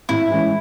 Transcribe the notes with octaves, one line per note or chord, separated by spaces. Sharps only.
A2 E4
E3 G#3 C#4